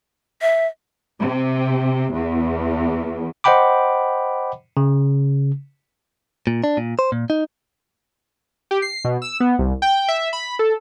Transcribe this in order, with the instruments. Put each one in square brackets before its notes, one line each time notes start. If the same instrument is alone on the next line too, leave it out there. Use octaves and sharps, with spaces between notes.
[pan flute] E5
[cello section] C3
E2
[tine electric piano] C5 D#5 F#5 G5 B5 D6
C#3
[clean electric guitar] A#2
D4
A#2
C5
A#2
D#4
[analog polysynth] G4
C7
B2
E6
B3
C2
G5
E5
B5
A4